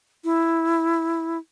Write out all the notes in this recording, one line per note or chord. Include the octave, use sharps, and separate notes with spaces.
E4